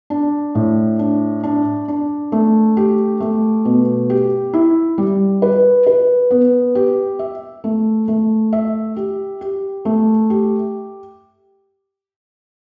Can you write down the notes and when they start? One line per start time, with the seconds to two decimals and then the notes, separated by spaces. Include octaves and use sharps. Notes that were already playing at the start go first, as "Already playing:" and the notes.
0.10 D4
0.55 A2
0.99 D4
1.43 D4
1.88 D4
2.32 A3
2.77 G4
3.20 A3
3.65 B2
4.10 G4
4.53 E4
4.98 G3
5.42 B4
5.87 B4
6.31 B3
6.75 G4
7.19 E5
7.64 A3
8.08 A3
8.53 E5
8.96 G4
9.41 G4
9.85 A3
10.30 G4